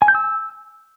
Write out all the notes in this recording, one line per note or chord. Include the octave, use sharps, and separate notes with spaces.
G#5
G6
E6